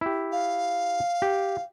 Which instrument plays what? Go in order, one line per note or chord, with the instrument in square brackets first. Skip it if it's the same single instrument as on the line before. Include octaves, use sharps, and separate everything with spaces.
[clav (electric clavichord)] E4 G4
[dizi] F5
[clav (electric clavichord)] G4